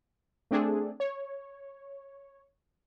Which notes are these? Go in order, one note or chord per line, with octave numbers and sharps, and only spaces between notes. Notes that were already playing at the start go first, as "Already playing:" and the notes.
A3 C4 D4 G#4 A4
C#5